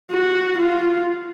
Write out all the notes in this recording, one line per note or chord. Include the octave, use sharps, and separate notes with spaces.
F#4
F4